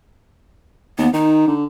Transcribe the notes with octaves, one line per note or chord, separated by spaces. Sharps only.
D#2 B3
D#3 D#4
D3